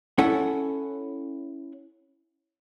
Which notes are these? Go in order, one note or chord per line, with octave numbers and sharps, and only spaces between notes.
C#4 E4 A4 F#5 G#5